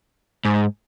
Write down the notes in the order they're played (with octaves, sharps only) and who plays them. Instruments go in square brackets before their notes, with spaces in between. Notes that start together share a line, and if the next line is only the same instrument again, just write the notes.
[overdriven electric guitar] G#2